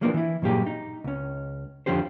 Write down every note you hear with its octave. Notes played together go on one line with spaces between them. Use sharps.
E3 F3 G#3 A#3 B3 D4
E3 E4
G2 A#2 F#3 A#3 G4 G#4
D#4
C#2 C#4
F2 D3 F3 C#4 G4 C5